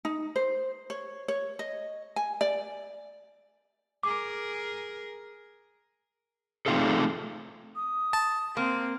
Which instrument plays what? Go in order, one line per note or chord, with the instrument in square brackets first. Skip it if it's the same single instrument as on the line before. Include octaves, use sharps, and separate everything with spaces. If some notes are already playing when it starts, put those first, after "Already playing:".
[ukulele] D#4
C5
C#5
C#5
D#5
G#5
D5
[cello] G#4 A#4 [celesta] D6
[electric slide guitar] A3 C4 D#4 F4 G#4 A4
[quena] D#6
[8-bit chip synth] A5
[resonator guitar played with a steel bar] A#3 [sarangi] C4